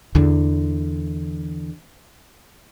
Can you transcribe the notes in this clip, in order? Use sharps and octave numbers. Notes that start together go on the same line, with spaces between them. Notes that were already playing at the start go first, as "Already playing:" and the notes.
E2 D3